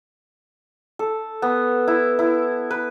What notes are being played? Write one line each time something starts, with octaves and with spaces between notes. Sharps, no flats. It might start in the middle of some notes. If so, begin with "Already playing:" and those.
A4
B3
E4
E4
B4